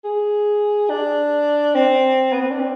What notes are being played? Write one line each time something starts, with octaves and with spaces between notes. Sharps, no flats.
G#4
D4
C4
B3
C4
D4
C4